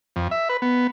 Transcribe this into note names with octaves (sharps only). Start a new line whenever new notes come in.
F2
E5
B4
B3